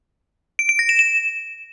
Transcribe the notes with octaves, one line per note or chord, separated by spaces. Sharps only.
D7
D7
A#6
E7
E7